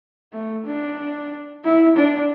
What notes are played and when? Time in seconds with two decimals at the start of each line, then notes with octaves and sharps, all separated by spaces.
0.33 A3
0.65 D4
1.64 E4
1.96 D4